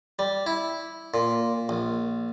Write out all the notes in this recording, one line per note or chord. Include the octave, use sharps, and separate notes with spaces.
G3
E4
A#2
A#1